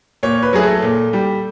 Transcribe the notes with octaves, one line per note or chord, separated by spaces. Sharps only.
A#2 C#5
B4
F#3 A3 G#4
A4
A#2
G3